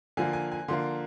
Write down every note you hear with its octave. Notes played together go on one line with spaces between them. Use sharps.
D3 F3 A#3 G#5
G#5
G#5
D3 F3 A#3 C6